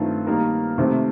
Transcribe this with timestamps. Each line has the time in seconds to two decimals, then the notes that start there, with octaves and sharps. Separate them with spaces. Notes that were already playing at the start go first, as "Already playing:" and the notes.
Already playing: G2 D#3 A3 C4 F4
0.26 D#3 G3 A#3 D#4 A#4
0.78 C3 D#3 A3 C4